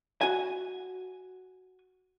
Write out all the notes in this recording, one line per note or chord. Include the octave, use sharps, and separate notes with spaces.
F#4 G#5